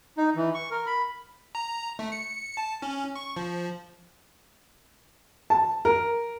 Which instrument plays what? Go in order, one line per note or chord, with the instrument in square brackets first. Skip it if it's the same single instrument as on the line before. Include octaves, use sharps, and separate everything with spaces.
[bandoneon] D#4
E3
C#6
A#4
B5
[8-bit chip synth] A#5
A3
C#7
A5
C#4
C#6
F3
[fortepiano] A5
A#4